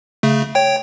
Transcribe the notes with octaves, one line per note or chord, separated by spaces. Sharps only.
C#3 A3
C#5 G5